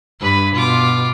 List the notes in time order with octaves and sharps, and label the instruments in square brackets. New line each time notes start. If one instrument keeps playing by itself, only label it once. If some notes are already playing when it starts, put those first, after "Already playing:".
[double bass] G2 [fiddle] B4 B5
[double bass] B2 [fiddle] F4 D6